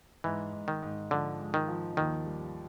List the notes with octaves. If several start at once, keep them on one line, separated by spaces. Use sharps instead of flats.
G#2 E3
G#2
D#3
G#2
D3 F3
G#3
D#3
F3
D#2 D#3
G3